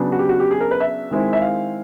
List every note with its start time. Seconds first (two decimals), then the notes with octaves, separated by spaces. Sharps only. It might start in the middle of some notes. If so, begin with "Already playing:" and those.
Already playing: C#3 F#3 B3 D4
0.12 F#4
0.19 G4
0.29 F#4
0.40 G4
0.51 G#4
0.61 A#4
0.71 B4
0.80 E5
1.11 D#3 G#3 C4 E4
1.33 E5
1.42 F5